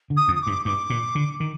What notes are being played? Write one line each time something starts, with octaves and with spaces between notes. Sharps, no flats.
D3
D#6
F2
D#6
D6
G2
G2 D6
A#2
D3
D#3